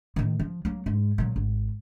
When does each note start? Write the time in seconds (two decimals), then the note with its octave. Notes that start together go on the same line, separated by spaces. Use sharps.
0.16 A2 D#3
0.40 F3
0.65 F#3 A#3
0.86 G#2 G#3
1.18 A#2 F#3
1.36 G#1